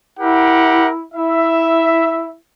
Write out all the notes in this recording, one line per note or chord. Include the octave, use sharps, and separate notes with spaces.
E4 G4 A#4 F#5
E4 E5